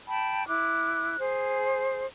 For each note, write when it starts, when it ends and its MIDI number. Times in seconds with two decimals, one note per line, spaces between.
0.07 0.47 79
0.07 0.47 81
0.07 0.47 83
0.47 1.17 64
0.47 1.17 86
0.47 1.17 90
1.19 2.06 68
1.19 2.06 72